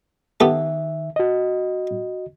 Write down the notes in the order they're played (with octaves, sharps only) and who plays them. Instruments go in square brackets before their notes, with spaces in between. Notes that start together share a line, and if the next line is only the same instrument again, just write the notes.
[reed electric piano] D#3 E5 [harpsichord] B3 G4 A4
[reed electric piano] F#4 D#5